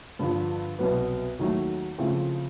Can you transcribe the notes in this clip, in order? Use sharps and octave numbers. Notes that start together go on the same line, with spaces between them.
G2 D3 F3
C2 B2 F#3 B3
D#2 D#3 F#3 A3
C#3 F3 A3 C4 E4